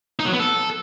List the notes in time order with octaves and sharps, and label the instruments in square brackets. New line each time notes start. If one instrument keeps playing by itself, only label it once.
[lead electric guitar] D#4
F#3
B3
A4